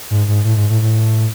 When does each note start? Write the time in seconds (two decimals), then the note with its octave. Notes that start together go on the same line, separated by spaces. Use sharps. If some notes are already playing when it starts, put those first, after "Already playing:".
0.11 G#2
0.28 G#2
0.45 A2
0.57 G#2
0.70 A2
0.82 A2